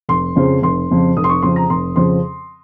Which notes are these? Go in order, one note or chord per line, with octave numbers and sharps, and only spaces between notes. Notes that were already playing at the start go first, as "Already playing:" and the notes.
F1 C6
F2 C#3 F3 C4
F1 C6
F2 C#3 F3 C4
F1 D#6
C6
C#6
F2 C#3 F3 C4 C6
A#5
F1 C6
F2 C#3 F3 C4 C6